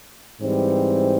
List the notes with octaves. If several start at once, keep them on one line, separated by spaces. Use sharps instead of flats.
G#2 E3 G3 C4